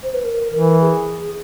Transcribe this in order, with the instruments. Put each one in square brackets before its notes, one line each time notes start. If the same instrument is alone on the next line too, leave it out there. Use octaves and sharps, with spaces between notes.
[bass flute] C5
B4
A#4
[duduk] E3 [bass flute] A#4
[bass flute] G#4